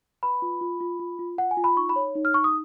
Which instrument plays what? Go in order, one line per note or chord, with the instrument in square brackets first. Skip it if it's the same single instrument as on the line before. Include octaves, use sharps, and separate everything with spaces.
[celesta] B4 B5
F4
F4
F4
F4
F4
F4 F#5
G#5
F4
B5
D#4 C#6
B5
C#5
D#4
F6
D#4 C#6
D#6